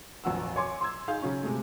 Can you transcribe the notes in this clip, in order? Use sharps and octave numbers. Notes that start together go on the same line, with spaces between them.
F1 A#1 F#3 F#5 E6
C#5 G#5 C6 D6
C6 E6 G#6
D#4 G#4 F5 G6
C#3 F#3 C#4
C3 G#3 A3